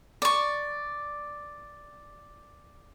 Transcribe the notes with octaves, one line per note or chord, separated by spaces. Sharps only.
D5 C#6